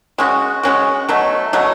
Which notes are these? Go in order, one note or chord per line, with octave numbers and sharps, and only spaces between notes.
G#3 C#4 F#4
G#3 C#4 F#4
B2 F#3 A3
B2 F#3 A3